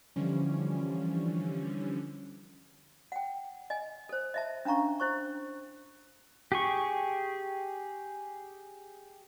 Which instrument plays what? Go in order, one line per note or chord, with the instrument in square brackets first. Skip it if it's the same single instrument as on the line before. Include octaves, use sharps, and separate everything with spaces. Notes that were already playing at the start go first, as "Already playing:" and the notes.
[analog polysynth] D3 E3 F3 G3 C#4
[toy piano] F#5 G5
D#5 G#5
A4 C5
D#5 E5 A5
C#4 D4 F5 A#5 C#6
E4 C5 C#6
[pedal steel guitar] G4 G#4 C#6